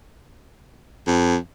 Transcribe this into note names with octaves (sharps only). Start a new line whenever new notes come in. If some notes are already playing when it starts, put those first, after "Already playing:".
F2